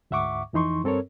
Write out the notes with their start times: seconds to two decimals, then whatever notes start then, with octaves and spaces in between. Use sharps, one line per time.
0.11 D2 G#2 E5 F#5 C#6 D6
0.53 F2 E3 D#4 C6 C#6
0.84 G2 C4 A4 A#4 C#5